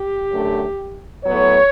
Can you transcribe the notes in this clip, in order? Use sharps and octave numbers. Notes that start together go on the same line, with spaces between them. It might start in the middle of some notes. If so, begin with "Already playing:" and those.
Already playing: G4
F#2 D3 A3
A2 F#3 B3 C#5